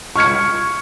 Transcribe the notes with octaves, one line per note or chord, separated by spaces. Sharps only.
C#6 F6 G#6 C#7